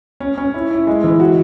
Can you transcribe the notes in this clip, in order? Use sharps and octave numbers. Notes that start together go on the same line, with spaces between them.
C#4
C#4
E4
E4
G#3
E3
F#4